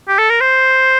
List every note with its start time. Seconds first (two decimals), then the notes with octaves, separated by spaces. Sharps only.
0.08 G4
0.19 A4
0.30 A#4
0.41 C5